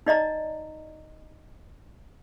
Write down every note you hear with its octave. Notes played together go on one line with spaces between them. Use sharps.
D#4 D5 D#5 A#5